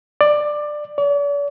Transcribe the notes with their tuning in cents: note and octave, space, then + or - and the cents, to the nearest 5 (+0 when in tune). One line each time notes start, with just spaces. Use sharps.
D5 +15
D5 -45